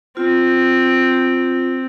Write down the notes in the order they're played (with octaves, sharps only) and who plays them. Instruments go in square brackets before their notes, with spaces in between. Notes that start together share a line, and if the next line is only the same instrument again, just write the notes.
[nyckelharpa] C4 [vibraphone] F4